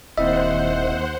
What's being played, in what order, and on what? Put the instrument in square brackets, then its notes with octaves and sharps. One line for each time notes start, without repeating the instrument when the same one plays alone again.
[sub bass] D#1 [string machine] D#2 C5 F#5 [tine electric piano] C4 E4 E5 [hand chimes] D#5